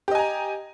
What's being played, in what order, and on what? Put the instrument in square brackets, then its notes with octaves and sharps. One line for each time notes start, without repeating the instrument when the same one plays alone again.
[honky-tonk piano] G4
D#5
G#5
A#5